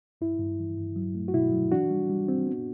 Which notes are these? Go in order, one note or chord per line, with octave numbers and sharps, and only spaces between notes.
G2 E4
G2
E3
G2
F#3
A3
F#4
B2 E4
F#3
E3 D4 F#4
G3
G3
C4
B3